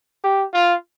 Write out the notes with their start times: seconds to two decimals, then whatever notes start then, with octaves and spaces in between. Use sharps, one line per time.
0.24 G4
0.53 F4